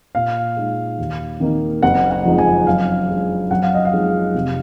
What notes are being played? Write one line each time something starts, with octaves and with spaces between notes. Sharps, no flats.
A#2 F5
G#3 D#4
D#2
D#3 A#3 D#4
F#1 F#5
F#5
F2 F3 G#3 D#4
G#5
F#2 F5
F3 G#3 D4
F#2 F#5
F5
D#5
F5
F3 G#3 D#4
F1